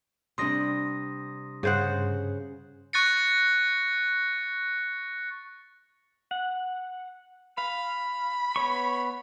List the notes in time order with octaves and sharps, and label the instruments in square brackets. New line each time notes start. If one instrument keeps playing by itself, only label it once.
[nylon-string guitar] C3 G3 D4 [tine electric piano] C6 D#6 A#6
[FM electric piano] G2 [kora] C#3 C5 F#5
[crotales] C#6 F#6 A6 A#6 C#7
[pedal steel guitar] F#5
[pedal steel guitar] F5 [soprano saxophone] B5
[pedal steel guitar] B3 C#5 C#6